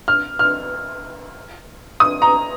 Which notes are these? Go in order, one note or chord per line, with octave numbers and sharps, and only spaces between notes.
F6
F6
D#6
A#5